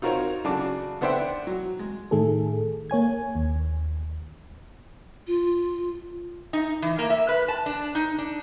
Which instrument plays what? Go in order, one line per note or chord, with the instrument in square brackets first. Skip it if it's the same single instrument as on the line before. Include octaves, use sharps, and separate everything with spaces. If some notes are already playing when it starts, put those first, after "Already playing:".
[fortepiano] D#4 F4 F#4 A#4 C5 C#5
C#3 F#3 D4 F#4 A5 D6
D3 B3 D4 C5 E5 G5
F#3
G#3
[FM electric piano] A2 D#3 A3 G#4 A4
A#3 C#5 G#5 G#6
D#2
[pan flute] F4
[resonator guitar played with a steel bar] D#4
E3
A#3
E5
B4
A5
D4
D#4
D4